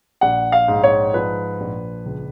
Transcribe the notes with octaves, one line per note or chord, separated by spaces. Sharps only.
A#1 F#5
F5
G#2
C#5
F3 B4
A#1
C#2